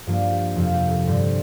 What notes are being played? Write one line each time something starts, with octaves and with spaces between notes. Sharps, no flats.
G2 F3 A#3 D4 F4
G4
F2 C3 F3 F4
G4
A#4
A4
G2 D3 G3 C4 G4